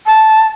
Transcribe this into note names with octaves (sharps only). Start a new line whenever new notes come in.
A5